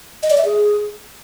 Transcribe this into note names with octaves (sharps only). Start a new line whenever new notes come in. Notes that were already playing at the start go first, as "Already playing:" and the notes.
D#5
D5
E5
G#4